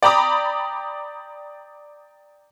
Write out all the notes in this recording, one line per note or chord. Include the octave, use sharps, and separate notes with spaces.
D5 G5 A#5 B5 D6 D#6